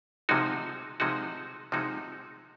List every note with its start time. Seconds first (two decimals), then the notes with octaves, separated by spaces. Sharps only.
0.29 C3 F3 G#3 D#4 F#4
1.00 C3 F3 G#3 D#4 F#4
1.72 C3 F3 G#3 D#4 F#4